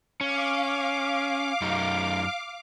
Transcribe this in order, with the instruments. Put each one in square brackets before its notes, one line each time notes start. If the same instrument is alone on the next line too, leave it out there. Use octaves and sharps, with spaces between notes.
[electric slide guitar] C#4 [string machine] F5 D6
[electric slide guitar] F#2 D#4